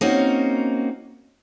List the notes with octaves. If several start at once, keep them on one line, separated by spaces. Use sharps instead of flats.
A#3 C4 C#4 D#4 F#4